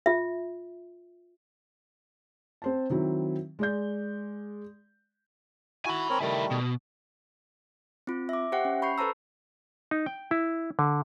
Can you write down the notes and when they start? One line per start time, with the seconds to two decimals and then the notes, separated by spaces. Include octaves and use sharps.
0.06 F4 E5
2.62 C4 C5 A5
2.90 D#3 F#3 C4 E4
3.59 G#3 D5 G6
5.86 E4 F#4 G#5 B5
6.10 C4 A#4 C#5
6.21 D#3 G3 A3 E4 A#4
6.51 B2
8.07 C4 F4
8.29 E5 D6
8.52 G4 C5 E5 F#5 G5
8.65 C#4
8.82 B5 C#6 G6 C7 C#7
8.98 A4 B4 C5 A5 A#5 E6
9.91 D#4
10.06 G5
10.31 E4
10.79 D3